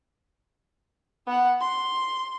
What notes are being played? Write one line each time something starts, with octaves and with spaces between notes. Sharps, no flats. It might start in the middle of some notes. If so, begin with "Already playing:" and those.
B3 F#5
C6